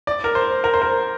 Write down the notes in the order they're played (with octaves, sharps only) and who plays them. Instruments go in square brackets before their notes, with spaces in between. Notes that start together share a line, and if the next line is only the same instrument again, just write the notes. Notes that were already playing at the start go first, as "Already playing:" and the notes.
[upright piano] D5
A#4
C5
A#4
C5
A#4